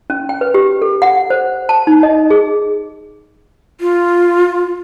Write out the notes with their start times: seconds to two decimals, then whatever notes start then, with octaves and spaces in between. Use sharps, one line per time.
0.10 C#4
0.29 G5
0.41 B4
0.54 G4
0.82 A4
1.02 F#5
1.30 C5
1.69 A5
1.87 D#4
2.03 D#5
2.30 G#4
3.81 F4